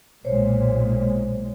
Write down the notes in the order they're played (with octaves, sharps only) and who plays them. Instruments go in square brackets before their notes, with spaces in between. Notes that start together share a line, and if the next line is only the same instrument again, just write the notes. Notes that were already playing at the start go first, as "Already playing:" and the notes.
[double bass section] B1 A#2 G#3 [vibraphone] C5 C#5